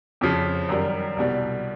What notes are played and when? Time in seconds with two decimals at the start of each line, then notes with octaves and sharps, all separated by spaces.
0.21 F2 C#3 F3
0.69 F#2 D#3 G3
1.17 C2 B2 G3